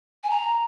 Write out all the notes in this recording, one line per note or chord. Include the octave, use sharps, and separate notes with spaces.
G#5
A#5